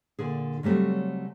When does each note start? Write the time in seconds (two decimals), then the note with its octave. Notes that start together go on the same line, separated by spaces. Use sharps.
0.19 A#2 D3 G#4
0.63 C#3 F#3 G3 A3 C4